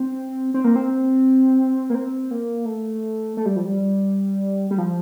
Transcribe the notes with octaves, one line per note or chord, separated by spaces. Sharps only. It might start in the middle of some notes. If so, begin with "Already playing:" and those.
Already playing: C4
C4
A#3
C4
A#3
C4
A#3
A3
A3
G3
F3
G3
G3
F3